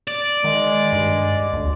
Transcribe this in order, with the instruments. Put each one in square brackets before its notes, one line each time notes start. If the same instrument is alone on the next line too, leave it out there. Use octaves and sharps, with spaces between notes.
[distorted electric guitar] D5
[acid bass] D#3 [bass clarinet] G#3
[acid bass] G2
D2